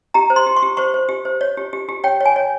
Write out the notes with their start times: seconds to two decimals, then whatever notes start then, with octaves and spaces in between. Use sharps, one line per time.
0.14 G4 A#5
0.30 C5
0.36 C6
0.47 G4
0.57 C#6
0.62 G4
0.77 C5 C#6
0.94 C5
1.09 G4
1.25 C5
1.41 C#5
1.57 G4
1.73 G4
1.89 G4
2.04 C#5 G5
2.21 C#5 G#5
2.36 C#5